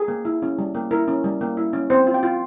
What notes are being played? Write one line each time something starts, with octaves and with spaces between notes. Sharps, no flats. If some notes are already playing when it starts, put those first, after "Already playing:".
Already playing: G#4
A#3
E4
C#4
G3
A#3
E4 A#4
C#4
G3
A#3
E4
C#4
C4 C5
F4
G5
F4